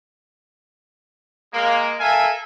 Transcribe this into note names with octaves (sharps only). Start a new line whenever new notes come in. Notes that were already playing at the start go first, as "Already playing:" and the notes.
G#3 A#3
A4 A#4 E5 F5 G#5